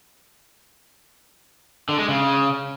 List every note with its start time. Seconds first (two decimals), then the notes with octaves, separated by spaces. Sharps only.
1.89 D3
1.99 G#3
2.09 C#3